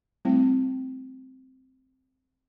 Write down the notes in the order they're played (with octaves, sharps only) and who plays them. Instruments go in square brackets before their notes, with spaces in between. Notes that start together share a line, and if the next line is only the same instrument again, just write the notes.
[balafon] G3 A3 C4 E4